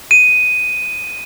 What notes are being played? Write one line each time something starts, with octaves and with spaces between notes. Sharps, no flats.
D#7